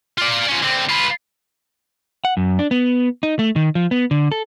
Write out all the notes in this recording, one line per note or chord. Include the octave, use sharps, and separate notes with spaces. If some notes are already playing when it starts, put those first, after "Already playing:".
F4 D5
F3 C#4
D3 C4
F4 B4
F#5
F#2
D4
B3
D#4
A3
D#3
F3
B3
D3
A4